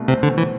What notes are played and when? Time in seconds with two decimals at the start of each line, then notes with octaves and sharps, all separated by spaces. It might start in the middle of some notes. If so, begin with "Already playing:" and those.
Already playing: C2 B2 A3
0.08 C3 C4
0.23 D3
0.28 B2
0.38 E3